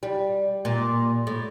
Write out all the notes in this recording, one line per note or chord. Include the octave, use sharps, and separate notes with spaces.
G3
A#2
A2